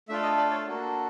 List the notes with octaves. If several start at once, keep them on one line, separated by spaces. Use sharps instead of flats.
A3 D4 F4 A4 E5
D#5
D5
C#5
A#3 D4 F#4 A4